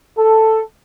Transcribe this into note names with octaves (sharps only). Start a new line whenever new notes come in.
A4